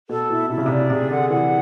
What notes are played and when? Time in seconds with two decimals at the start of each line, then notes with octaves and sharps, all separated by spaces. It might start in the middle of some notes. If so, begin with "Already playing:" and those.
0.09 B2 A4
0.29 B2 E4
0.50 C3 E4
0.58 C#3
0.66 C3 D5
0.90 C3 G#4
1.10 D3 F#5
1.30 E3 F#5